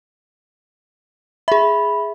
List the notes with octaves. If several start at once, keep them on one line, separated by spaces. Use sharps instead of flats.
G#4 E5 B5